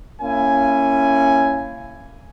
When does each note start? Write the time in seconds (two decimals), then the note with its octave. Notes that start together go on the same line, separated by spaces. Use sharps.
0.22 A#3 C#4 E4 G#5